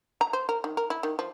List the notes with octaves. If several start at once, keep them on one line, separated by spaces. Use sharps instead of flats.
A#5
C5
A#4
D#3
A#4
E4
D#3
F3